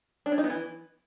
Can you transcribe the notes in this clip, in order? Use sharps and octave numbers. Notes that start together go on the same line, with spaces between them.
D4
C#4
D#4
B3
E3